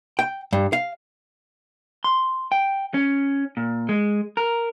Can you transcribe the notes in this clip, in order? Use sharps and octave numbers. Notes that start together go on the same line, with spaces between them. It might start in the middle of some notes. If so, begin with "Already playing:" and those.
G5
G2
F5
C6
G5
C#4
A#2
G#3
A#4